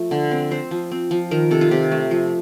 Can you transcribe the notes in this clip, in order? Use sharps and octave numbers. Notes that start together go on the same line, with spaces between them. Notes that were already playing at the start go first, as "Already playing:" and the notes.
Already playing: F3 A3
D3
C4
C4 C5
F3
C4
F3
D#3 A#4
C3 A4
F4
C3 G4
A3
F3